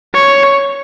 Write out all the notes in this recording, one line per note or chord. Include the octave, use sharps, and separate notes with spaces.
C#5